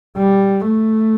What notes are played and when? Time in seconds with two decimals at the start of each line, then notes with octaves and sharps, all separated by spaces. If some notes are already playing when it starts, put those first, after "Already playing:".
0.17 G3
0.67 A3